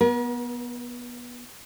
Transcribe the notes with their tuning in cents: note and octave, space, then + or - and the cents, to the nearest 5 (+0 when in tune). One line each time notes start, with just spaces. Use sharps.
B3 -20 A#4 +45